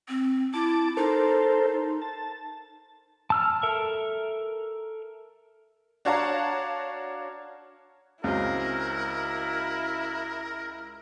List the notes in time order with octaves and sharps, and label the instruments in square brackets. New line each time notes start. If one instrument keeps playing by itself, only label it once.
[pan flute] C4
[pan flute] E4 [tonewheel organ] A5 D6
[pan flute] D#4 [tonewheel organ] A4 A#4 C5
[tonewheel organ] A5
[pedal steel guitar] A5 E6 F6
A4 A#4 E5
[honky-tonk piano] D4 F#4 C#5 F5 A5 A#5
[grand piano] C#2 C4 [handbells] C#4 F#4 [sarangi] E4 [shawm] A#4